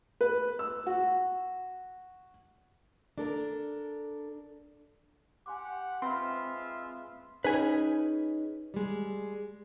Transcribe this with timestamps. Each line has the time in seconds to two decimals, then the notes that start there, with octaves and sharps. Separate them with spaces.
0.21 B4
0.59 E6
0.86 F#4
3.18 D4 A4 A#4
5.46 G4 F#5 G#5 C6 D6
6.02 G#3 C4 F4 B4 E5 B5 C6 F6
7.44 C#4 D#4 G#4 B4 G#5
8.74 G3 G#3